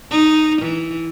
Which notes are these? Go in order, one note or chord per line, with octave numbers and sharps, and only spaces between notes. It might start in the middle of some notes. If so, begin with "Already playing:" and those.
D#4
E3